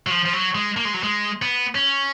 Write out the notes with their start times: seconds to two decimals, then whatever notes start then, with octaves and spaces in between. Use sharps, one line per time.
0.07 F#3
0.11 F3
0.25 F3
0.33 F#3
0.55 G#3
0.77 A#3
0.85 G#3
0.94 F#3
1.03 G#3
1.42 B3
1.75 C#4